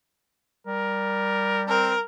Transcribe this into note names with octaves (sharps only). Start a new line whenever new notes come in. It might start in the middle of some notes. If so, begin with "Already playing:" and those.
G3 A#4
C4 A#4